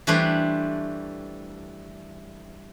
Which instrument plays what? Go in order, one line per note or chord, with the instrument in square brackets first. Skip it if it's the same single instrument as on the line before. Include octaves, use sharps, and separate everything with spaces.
[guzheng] E3 G3 A3 D4 C5 C#5